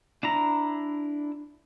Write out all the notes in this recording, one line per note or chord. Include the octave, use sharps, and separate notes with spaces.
D4 E4 A#5